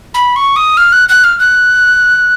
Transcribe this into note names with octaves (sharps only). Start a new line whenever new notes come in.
B5
C#6
D#6
F6
F#6
F#6
F6
F#6